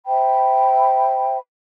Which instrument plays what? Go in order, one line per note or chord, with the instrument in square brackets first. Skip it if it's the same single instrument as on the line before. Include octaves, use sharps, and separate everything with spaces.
[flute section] C5 E5 G5 B5